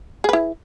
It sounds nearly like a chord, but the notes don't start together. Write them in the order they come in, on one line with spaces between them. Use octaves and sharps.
G#4 B4 E4